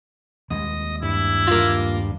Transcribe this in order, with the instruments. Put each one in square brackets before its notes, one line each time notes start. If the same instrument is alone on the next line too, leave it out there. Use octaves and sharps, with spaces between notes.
[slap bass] D#2 G3 G#3 [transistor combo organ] D#5 D#6
[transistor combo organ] G2 [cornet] E4
[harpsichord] A#3 F4